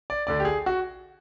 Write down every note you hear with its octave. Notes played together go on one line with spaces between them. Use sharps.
D5
D2 D3 D5
G4
G#4
F#4